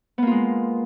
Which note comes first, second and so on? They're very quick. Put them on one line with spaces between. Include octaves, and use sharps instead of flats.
B3 A#3 F4 G#3